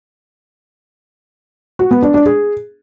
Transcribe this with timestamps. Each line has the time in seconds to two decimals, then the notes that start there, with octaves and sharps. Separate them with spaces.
1.79 F#4
1.91 B3
2.02 D4
2.14 D4
2.26 G#4